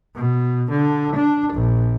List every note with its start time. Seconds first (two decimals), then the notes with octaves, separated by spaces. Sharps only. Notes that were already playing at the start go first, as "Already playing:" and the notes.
0.15 B2
0.70 D3
1.15 D4
1.53 A#1